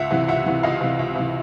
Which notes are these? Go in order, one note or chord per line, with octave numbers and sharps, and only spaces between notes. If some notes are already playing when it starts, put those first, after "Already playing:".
Already playing: C#2 E5 F#5
C3 E3
C#2 E5 F#5
C3 E3
C#2 D#5 F5
C3 E3
C#2
C3 E3